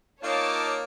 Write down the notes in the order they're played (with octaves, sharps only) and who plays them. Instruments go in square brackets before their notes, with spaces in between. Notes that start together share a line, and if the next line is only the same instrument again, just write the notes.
[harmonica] A#3 D#4 F4 [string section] C#5 A5 D6